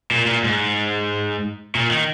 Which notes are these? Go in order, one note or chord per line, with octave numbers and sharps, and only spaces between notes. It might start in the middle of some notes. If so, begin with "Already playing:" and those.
A#2
A#2
G#2
A#2
D#3